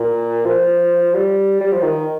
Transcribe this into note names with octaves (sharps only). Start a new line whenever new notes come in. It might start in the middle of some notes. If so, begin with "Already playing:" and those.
Already playing: A#2
F3
G3
G3
F3
D#3